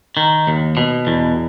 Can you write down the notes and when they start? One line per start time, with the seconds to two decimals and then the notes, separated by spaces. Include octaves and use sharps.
0.17 D#3
0.47 D#2
0.77 B2
1.07 E2